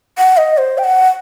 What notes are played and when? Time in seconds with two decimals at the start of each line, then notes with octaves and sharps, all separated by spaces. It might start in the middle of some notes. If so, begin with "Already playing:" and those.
0.18 F#5
0.37 D#5
0.58 C5
0.78 G5
0.84 F#5